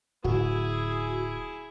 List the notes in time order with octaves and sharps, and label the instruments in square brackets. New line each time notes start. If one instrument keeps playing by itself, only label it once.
[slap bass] D1 [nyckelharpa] E4 G#4 [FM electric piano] F#4